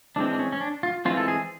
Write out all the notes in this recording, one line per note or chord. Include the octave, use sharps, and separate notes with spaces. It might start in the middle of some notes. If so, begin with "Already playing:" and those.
E3 G#3 C4 D4
D4
C#4
C#4
D4
F4
E3 G#3 C4 F4
A4
G#4